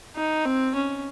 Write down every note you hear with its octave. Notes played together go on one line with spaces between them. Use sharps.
D#4
C4
C#4